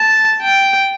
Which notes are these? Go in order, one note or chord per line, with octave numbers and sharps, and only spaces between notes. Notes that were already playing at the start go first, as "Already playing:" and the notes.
Already playing: A5
G5